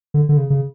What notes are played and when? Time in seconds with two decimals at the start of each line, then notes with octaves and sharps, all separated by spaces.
0.14 D3
0.29 D3
0.37 C#3
0.50 C#3